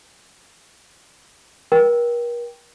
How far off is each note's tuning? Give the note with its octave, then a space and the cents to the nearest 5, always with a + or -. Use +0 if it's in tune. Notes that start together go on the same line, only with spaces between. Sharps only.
A#4 +40 G5 +0